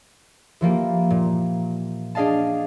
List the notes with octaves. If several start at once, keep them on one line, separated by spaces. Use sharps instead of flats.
E3 F3 A#3 G4
A#2
D4 G#4 D#5 F5 A5